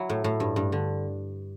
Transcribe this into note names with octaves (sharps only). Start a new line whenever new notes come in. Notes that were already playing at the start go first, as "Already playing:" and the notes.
Already playing: F#3 E4
A2
A2
G2
G2
D3